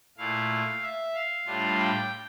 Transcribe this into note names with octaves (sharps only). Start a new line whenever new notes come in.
A#2 A3 E4 F5
E5
F5
A2 G3 D4 F4
G5